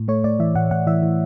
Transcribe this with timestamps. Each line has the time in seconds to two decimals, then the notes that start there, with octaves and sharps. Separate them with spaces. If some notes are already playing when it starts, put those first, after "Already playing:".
Already playing: A2
0.08 A3 C#5
0.24 A2 D5
0.39 E3 E5
0.55 A2 F#5
0.71 A2 F#5
0.87 E3 E5
1.03 E3